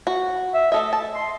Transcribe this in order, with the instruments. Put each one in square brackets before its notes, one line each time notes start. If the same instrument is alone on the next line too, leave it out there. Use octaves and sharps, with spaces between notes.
[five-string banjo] F#4
[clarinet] E5
[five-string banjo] A3 A4 E5 [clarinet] D#5
[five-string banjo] A5
[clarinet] C6